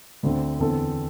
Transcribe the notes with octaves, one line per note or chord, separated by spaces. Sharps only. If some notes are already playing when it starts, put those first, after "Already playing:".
D2 D3 C4
E2 D3 C4 A4 C5